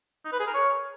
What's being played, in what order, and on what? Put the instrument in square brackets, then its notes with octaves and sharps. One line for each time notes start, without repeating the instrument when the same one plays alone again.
[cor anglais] D#4
B4
G#4
A#4
C#5